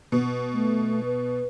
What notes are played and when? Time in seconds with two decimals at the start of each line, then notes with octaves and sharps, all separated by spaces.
0.12 B2
0.54 A3
1.05 B4